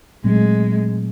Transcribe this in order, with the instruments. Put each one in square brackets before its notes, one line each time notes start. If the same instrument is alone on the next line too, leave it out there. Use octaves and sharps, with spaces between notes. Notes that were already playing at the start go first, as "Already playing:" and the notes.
[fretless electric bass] A#2 F#3 A3 C4 [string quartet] G#3